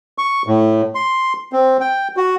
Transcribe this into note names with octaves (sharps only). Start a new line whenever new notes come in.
C#6
A2
C6
C4
G5
F#4